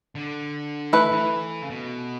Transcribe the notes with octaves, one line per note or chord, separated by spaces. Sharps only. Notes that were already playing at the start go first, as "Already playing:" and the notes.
D3
E3 A3 E4 B4
E3
C#3
B2